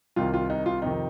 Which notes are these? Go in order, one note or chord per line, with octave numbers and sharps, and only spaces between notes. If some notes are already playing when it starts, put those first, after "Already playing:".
C2 C3 D#3 F4
F4
D#4
F4
F2 C3 D#3 D#4